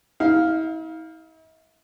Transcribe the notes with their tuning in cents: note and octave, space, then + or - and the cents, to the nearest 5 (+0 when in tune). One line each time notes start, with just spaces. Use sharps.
E4 -45 F5 +0